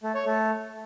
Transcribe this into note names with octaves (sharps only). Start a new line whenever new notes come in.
A3
C#5
A3